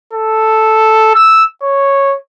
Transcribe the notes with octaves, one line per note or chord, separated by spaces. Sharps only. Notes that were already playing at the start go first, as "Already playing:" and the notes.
A4
E6
C#5